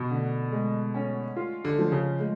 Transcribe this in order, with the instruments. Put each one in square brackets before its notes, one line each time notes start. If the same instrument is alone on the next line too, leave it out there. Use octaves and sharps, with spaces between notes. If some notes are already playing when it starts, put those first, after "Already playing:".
Already playing: [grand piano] B2
[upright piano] D3
G#3
C#4
F4
[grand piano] D3
[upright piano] F3
[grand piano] C#3
[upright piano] G#3